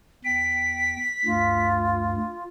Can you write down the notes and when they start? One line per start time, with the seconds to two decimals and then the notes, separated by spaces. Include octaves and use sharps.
0.24 E2 G5 B6
1.25 D2 G2 F4